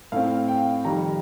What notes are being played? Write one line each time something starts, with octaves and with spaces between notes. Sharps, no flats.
A2 A3 C4 F5
G5
F2 D#3 G3 A#5